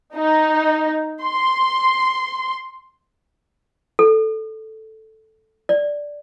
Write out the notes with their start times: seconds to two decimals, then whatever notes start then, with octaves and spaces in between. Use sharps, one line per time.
0.16 D#4
1.23 C6
3.99 A4
5.69 D5